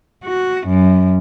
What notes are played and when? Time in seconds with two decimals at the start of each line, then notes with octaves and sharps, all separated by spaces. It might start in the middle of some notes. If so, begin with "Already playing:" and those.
0.24 F#4
0.67 F#2